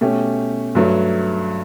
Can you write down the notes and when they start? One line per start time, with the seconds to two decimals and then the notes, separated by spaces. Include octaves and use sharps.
0.01 B2 A3 C#4 G4
0.75 G2 F#3 A3